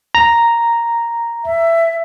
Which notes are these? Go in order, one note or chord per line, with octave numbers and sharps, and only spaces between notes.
A#5
E5